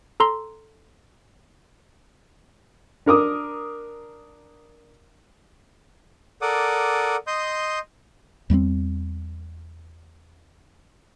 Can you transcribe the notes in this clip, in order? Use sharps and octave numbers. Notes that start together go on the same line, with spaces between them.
A4 A#5 C6
D4 A#4 D6 D#6
A4 A#4 D5 F#5 D6 D#6
D#5 C6 D#6 G6
E2 G3 A3 C4